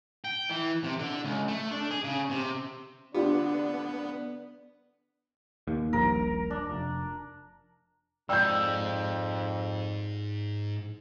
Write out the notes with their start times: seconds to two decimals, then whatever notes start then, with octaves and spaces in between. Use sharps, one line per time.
0.25 G5
0.49 E3
0.83 C3
0.99 D3
1.24 C#2
1.48 A3
1.71 D4
1.91 G#4
2.04 C#3
2.30 C3
3.14 D3 B3 D4 F4 G4
5.68 D#2
5.93 D#1 A#1 A#4
6.50 D4
6.69 F1
8.29 F2 G#2 D5 G5 E6 G6